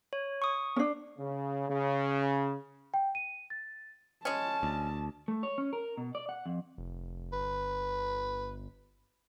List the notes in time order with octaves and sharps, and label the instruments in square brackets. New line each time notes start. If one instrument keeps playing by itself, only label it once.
[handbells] C#5
C#6 D#6
[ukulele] C#4 D4
[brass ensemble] C#3
C#3
[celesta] G5
D#7
A6
[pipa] G#3 C#4 [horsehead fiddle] A5
[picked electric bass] D2
[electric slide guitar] A3
C#5
C#4
A#4
B2
D5
F#5
F2
[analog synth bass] F1
[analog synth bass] G1 [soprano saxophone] B4